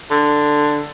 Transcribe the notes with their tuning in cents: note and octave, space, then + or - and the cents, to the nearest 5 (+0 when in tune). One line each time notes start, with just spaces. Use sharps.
D3 +10